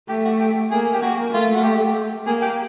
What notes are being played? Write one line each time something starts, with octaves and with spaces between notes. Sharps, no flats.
A3 G4
F#4
G4
A#3 G#4
G4
A#3 F#4
A3 F4
F#4
G4
A#3 G#4
G4